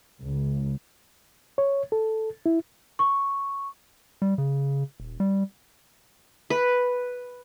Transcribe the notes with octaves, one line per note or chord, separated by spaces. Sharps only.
C#2
C#5
A4
E4
C#6
G3
C#3
D#1
G3
B4